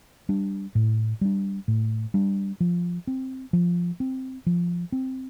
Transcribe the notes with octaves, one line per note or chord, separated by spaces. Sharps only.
G3 D4
A2
G3 D4
A2
G3 D4
F3
C4
F3
C4
F3
C4